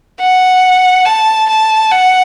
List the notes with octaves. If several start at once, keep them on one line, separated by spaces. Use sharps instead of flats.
F#5
A5
A5
F#5